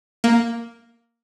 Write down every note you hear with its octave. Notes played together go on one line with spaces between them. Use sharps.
A#3